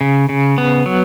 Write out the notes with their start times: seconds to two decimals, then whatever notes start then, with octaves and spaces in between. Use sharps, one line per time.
0.01 C#3
0.29 C#3
0.58 B3
0.86 F#3